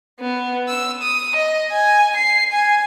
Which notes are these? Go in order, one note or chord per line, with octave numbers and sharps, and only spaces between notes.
B3
E6
D#6
D#5
G#5
C7
G#5